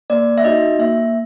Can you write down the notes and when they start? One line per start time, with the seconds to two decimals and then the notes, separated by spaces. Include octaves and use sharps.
0.10 A#3 D5
0.38 E5
0.44 D#4 F#4 D#5
0.79 A#3 E5